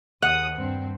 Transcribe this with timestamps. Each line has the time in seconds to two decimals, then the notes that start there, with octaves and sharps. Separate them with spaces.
0.22 D#2 F#5 D#6
0.57 G2 C4